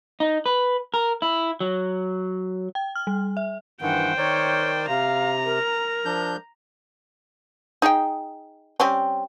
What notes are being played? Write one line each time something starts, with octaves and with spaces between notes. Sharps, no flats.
D#4
B4
A#4
E4
F#3
G5
F6
G3
E5
G2 D#3 E3 C5 F#5 G5
D#3 A#4 C#5 D5
C3 F5 A#5
A#4
F3 D4 G6
D#4 G#4 G5
G3 C4 C#4